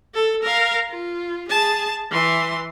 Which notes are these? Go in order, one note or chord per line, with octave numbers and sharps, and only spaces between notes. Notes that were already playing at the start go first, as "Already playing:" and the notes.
A4
A#4 F5
F4
G#4 A5
E3 C6